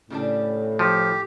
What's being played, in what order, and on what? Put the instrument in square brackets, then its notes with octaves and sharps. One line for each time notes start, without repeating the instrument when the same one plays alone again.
[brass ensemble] A2 [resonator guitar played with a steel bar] C#3 G3 D4
[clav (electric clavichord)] F3 [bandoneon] G4